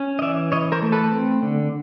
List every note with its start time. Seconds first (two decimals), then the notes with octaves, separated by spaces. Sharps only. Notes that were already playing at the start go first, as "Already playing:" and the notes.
Already playing: C#4
0.19 D#5
0.22 E3 D5 E5
0.52 E3 C#5 D#5
0.72 A#4 C5
0.82 A3
0.92 A4 B4
1.12 C4
1.43 D3